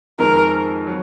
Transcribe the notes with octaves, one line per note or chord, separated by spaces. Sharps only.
F2 D#3 G#3 A#4
F#3